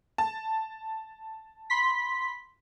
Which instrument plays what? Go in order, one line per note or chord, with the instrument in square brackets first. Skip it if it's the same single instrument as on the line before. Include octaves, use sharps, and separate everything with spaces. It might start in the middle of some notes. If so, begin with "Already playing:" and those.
[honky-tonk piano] A5
[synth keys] B5 C6 B6